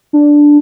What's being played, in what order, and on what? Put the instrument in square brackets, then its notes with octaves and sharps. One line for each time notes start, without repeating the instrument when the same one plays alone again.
[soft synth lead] D4